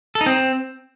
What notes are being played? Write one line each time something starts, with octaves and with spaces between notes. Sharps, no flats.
A4
D#4
C4